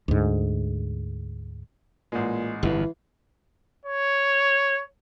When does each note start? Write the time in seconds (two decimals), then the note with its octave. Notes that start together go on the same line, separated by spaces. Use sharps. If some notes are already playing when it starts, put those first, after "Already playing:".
0.08 D2 G#2
2.12 A1 A#2 G#3
2.63 G1 F2 E3
3.85 C#5